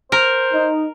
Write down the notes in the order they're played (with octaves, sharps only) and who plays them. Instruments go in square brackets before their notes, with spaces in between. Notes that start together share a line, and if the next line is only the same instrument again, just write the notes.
[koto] A#4 [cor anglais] C5
[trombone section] D#4